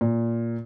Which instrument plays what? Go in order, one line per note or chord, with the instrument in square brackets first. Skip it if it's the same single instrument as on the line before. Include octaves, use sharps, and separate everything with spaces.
[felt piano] A#2